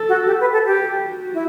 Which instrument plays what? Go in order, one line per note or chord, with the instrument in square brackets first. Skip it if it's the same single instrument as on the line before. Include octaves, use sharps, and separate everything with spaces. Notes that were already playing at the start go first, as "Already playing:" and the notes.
Already playing: [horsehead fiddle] A4
[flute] F#4
G4
B4
A4
G4
[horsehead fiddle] F#4
[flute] E4